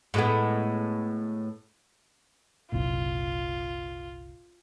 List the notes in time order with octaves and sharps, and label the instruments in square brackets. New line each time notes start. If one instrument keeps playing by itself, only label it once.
[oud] A2 G#3 B3
[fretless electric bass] F#1 C2 A#2 [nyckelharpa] F4